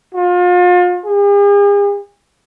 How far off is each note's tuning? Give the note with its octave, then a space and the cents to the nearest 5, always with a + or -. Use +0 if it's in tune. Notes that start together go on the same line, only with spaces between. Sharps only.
F4 +35
G#4 -45